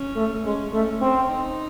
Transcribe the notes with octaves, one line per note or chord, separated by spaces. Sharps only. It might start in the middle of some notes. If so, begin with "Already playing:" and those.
Already playing: C#4
A3
G#3 C#4
A3 C#4
C4
D#4